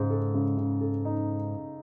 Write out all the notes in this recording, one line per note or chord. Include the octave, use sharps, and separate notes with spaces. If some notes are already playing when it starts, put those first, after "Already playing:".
Already playing: G#2 C#3 G#3
A4
C#3
C#3
A4
D#4